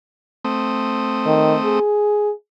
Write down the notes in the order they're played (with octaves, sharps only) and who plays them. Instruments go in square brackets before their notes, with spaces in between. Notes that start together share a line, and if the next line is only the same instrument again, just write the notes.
[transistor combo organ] A3 C4 D#6
[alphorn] D#3
G#4